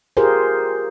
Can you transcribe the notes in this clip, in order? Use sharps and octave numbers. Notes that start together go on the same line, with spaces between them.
F4 G4 G#4 A#4 C5